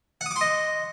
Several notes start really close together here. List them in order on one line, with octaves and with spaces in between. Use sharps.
F#5 D#6 D6 C6 D#5